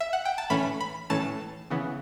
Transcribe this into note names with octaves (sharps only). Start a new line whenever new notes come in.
E5
F#5
G5
A5
A2 E3 A3 C#4 B5
B5
A2 E3 A3 C#4 A5
C#3 E3 B3